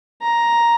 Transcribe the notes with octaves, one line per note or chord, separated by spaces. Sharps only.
A#5